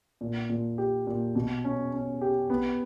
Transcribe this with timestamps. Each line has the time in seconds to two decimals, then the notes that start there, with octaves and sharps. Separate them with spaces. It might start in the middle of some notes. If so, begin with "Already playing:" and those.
0.21 A#2
0.49 A#2
0.78 G4
1.07 A#2
1.36 B2
1.64 C#4
1.93 C#4
2.21 G4
2.50 B3